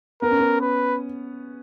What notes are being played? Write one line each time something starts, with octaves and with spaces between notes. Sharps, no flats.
B3 A#4
C#4
B3
B4